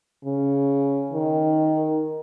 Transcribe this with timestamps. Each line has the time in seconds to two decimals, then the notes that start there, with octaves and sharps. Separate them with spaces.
0.24 C#3
1.12 D#3